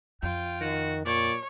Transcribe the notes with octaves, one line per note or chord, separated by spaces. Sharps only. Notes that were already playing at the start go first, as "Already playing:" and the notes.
F2 F4 G5
D#3 F#4
A#2 C#5 D5